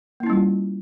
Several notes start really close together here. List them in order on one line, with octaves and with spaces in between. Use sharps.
A#3 E4 C#4 G3 F4